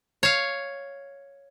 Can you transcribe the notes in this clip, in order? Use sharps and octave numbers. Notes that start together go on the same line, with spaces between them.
C#5 F5